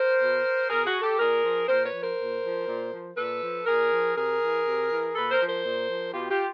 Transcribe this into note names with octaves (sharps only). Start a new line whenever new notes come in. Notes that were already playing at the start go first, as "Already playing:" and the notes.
Already playing: A#4 C5
B2
B2 G#4 A#4
F#4 G#4
G4 A4
A#2 G#4 A#4
F3
A#2 A#4 C5
B4 C#5
F3
A#4 C5
A#2
F3
A#2
F3
A#2 A4 B4
F3
A#2 G#4 A#4
F3
C3 G#4 A#4
E3
C3
E3
A#2 A4 B4
A#4 C5
F3
A#4 C5
A#2
F3
B2 F4 G4
F4 G4